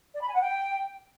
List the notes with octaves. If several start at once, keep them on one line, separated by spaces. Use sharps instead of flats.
D5
B5
G#5
F#5
G5